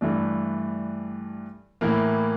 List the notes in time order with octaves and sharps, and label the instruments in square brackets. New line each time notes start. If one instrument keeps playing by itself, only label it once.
[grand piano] G2 E3 A3 D4
A2 E3 A#3